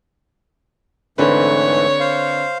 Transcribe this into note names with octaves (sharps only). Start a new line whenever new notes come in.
G#2 D3 E3 A3 C4 B4 C#5
C5 F5